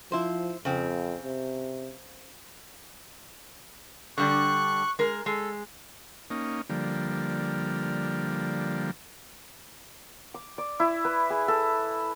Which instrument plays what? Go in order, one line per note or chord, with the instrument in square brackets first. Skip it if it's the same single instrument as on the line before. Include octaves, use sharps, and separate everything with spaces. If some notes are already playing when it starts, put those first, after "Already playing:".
[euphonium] F3 [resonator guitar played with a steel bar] E4 C5
[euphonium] F2 [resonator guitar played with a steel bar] C#3 C4
[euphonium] C3
[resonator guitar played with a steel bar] D3 G3 D4 [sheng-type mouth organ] C#6 F#6
[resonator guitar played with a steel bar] G#3 A#4
[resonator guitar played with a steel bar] G#3 [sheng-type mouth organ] A4
[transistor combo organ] A#3 C#4 D#4
D3 F3 G3 A#3
[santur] D6
D5
E4
B4
G#4
A4